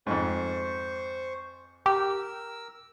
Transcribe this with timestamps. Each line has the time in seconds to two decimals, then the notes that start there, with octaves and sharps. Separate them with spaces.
0.07 F2 G#2 C5 C#6
1.86 G4 A#4 E6